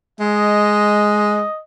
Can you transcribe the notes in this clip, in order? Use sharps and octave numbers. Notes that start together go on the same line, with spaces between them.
G#3 D#5